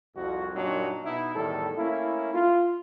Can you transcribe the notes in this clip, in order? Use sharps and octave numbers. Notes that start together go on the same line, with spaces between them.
C2 F2 F#4
F#2 A#2 F#3 G3 D4 D#4
B2 D#4 E4
E2 A2 D#3 G3 A4
A3 A#3 C#4 E4
F4